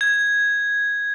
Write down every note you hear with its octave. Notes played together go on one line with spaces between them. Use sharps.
G#6